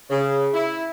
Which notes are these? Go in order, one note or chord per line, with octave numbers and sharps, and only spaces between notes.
C#3
E4